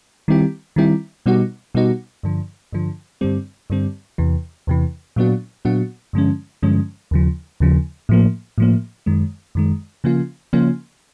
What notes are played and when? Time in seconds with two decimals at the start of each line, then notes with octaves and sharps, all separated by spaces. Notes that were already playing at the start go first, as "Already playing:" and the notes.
0.28 D#3 G3 C4 E4 G4
0.76 D#3 G3 C4 E4 G4
1.26 B2 G3 B3 D#4 F#4
1.75 B2 G3 B3 D#4 F#4
2.23 G2 D3 F3
2.73 G2 D3 F3
3.21 G2 D3 G3 C4
3.70 G2 D3 G3 C4
4.18 E2 C3 E3
4.67 E2 C3 E3
5.16 A#2 F#3 B3 D4 F#4
5.65 A#2 F#3 B3 D4 F#4
6.13 G2 D3 F3 G#3 C#4
6.63 G2 D3 F3 G#3 C#4
7.11 D#2 C#3 F3
7.60 D#2 C#3 F3
8.09 A2 F3 A#3
8.58 A2 F3 A#3
9.06 F#2 D#3 G#3
9.55 F#2 D#3 G#3
10.04 C#3 F3 A#3 C#4 F4
10.53 C#3 F3 A#3 C#4 F4